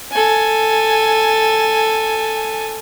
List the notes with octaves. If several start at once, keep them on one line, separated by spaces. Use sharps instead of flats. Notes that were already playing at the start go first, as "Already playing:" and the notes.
A4 G#5